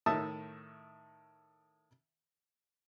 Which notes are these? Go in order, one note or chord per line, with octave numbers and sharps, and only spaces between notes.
A2 D#3 E5 A5 D#6